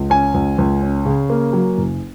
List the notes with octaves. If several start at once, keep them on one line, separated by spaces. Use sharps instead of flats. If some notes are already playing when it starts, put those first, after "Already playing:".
Already playing: C#2
C#4 G#5
C#2
C#2
C#4
C#3
A#3
F#3
F#1